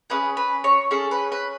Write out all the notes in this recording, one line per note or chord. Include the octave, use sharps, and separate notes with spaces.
C#4 G#4 B4
B4
C#5
C#4 G#4 A4
B4
B4